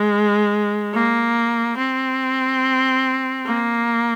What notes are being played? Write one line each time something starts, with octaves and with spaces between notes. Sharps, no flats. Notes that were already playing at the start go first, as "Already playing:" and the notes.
Already playing: G#3
A#3
C4
A#3